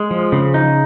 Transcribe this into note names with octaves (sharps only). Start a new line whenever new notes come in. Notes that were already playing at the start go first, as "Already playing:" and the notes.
Already playing: G#3
F3
C#3
D#4